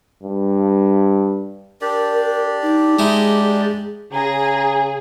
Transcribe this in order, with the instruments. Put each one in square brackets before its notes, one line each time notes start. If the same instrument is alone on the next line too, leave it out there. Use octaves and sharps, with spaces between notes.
[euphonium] G2
[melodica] D4 G4 D5 [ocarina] A#4
[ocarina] D#4
[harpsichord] G#3 D#4 E4 [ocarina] G#4
[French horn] C#3 [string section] G#4 [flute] A#5